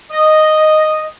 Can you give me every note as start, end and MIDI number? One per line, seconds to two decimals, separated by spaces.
0.10 1.06 75